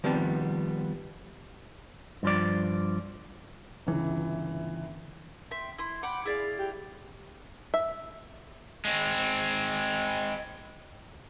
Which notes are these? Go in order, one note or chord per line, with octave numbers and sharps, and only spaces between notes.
D#3 F3 G3 B3 C4
G2 F3 D5
G1 C#2 E3
E5 G5 C6
E4 C6
F#5 G5 B5 D6
E4 G#4 D5 F5
G4
E5
G#3 C4